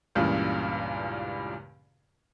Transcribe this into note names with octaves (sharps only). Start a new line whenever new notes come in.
C#2 G2 A#2 C#3 E3